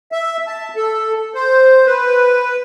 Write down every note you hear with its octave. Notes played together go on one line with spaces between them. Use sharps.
E5
A5
A4
C5
B4